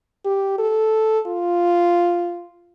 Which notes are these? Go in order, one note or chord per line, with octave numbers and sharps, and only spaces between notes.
G4
A4
F4